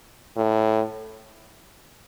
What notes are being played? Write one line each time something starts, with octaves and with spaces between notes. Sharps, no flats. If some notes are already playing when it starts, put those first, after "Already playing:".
A2